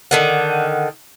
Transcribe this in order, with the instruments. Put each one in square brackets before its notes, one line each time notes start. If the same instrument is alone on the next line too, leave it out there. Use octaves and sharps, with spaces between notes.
[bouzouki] D3 D#3 F#5